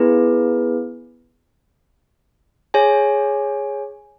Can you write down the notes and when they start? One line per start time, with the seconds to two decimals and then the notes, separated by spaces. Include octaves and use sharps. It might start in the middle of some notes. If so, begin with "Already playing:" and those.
Already playing: B3 E4 G#4 B4
2.74 G#4 C#5 G#5